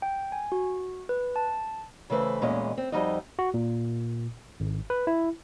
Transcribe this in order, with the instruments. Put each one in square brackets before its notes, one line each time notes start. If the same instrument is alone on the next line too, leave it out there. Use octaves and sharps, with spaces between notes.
[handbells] G5
G#5
F#4
B4
A5
[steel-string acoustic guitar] C#3 E3 A3 B4 C5
E2 A#2 G#3 C#4 D#5
C4
F2 F3 G3 D#4 F#4 D#5
[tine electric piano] F#4
A#2
G#1
B4
E4